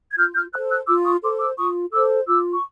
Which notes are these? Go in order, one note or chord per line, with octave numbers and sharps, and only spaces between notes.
G#6
F4 F6 G6
F6 G6
A4 C5 E6 F#6
E6 F#6
F4 D6 E6
C#6 D#6
A4 C5 C6 D6
D6 E6
F4 C#6 D#6
A4 C5 D6 E6
F4 D6 E6
C#6